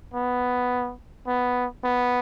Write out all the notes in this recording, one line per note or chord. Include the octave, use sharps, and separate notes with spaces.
B3
B3
B3